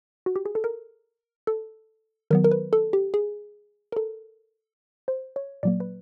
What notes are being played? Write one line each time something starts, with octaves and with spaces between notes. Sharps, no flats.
F#4
G4
G#4
A4
A#4
A4
D#3 F#3 B3 A#4
A#4
B4
A4
G4
G#4
A#4
A4
C5
C#5
A#2 F#3 A#3 D5
B4